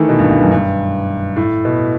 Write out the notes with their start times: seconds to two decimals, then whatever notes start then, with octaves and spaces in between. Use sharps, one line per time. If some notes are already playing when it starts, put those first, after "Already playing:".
Already playing: D#3 E3 A3
0.09 B2
0.19 G2
0.30 G2
0.41 F#2
0.51 G2
1.36 A2
1.65 B2